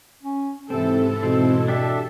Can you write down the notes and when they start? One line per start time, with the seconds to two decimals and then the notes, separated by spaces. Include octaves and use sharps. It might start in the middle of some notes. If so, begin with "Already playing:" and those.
0.23 C#4
0.70 G#2 C3 E3 C4 E4 A4
1.23 B2 C4
1.68 D4 G4 A4 E5